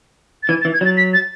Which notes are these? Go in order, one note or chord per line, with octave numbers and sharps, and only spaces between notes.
A6
E3 G#6
A6
E3
G#6
F#3 A6
B6
A6